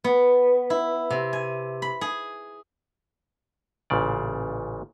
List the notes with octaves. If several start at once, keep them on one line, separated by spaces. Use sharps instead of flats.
B3
E4
C3
G#5
B5
G#4
A1 A#2 C#3 D5